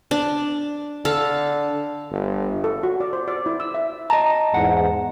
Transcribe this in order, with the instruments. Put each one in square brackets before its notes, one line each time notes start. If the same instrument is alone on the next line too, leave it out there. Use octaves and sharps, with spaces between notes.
[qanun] D4
[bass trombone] D3 [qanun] A4 F5
[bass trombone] G1
[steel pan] A4
F#4
D5
C5
D5
E4
E6
E5
[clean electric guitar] D#5 A5 [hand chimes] A#5
[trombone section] E2 G#2 [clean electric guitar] F#5